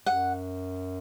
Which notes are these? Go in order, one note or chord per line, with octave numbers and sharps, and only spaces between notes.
F#2 F#5